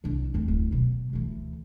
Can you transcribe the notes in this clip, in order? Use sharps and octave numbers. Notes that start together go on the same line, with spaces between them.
C2 D4
F1 C4
D1
B2 F#3
D2 E3